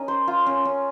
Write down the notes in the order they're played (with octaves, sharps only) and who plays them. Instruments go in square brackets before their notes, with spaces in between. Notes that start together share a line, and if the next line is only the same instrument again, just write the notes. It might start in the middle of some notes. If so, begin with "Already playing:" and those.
Already playing: [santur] C#4 D#4 A#4 D#5
C5
F4
C#4
C#4